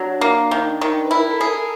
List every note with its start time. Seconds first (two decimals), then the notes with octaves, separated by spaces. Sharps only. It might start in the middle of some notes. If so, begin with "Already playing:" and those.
Already playing: F#3 D4
0.21 A#3
0.51 D#3
0.81 D#3
1.05 B4
1.11 E4
1.18 A#4
1.30 A4
1.41 G#4